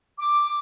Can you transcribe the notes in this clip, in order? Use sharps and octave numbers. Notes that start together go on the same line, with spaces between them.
D6